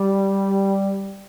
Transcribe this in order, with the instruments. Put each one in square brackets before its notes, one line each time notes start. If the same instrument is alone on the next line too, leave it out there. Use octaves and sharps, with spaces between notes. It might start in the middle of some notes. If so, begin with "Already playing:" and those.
Already playing: [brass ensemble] G3